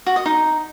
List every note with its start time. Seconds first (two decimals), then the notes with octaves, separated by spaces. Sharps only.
0.06 F#4
0.16 D#5
0.26 D#4